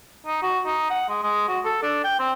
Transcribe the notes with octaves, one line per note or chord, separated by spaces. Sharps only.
D#4
F#4
D#4
F#5
G#3
G#3
F#4
A4
D4
G5
C4